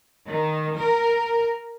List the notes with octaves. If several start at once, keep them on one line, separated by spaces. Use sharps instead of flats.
D#3
A#4